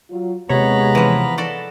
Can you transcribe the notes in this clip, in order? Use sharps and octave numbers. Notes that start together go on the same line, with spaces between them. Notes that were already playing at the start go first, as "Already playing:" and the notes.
F#3 F4
D#2 C3 G#3 B3 C#5 A#5 B5
E3 F3
F#4 A4 D5